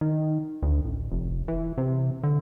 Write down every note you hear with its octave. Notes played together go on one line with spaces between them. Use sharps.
D#3
D2
A1
F1
E3
C3
D3